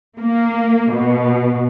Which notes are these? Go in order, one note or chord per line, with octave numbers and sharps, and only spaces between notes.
A#3
B2